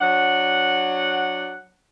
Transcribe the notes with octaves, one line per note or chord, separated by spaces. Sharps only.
F#3 D4 F#5